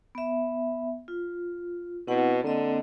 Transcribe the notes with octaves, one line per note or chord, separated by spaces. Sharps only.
B3 E5
F4
B2 C4 E4 F#5
D3 A#3 C4 D#5